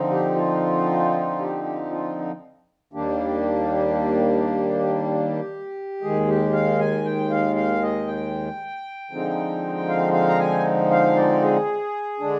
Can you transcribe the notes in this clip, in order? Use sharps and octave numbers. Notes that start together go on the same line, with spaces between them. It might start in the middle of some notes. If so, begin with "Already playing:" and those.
Already playing: D3 F3 C4 D#4
G4
F4
G4
G4
F4
D#2 D#3 G3 A#3 D4 G4
D#2 D#3 G#3 G#4
G4
F5
G#5
G5
F5
F5
D#5
G5
D3 F3 G#3 C4 D#4
F5
F5
A#5
G#5
F5
D5
G#4
D3 G#3 D4